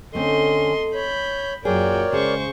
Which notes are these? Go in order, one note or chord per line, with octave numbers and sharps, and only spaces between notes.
D3 A3 C4 C#4 A4 D#5 C6
C#5 B5 G6
F#2 A#2 F#4 G#4 A#4 C#5 D5 G5
C#3 G#3 G#4 C5 C#6